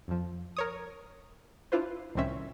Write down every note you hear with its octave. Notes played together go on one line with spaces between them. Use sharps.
F2 F3
A#4 C#5 D#6
D4 E4 F4 B4 C5
C2 A2 D#3 C4 C#4 E5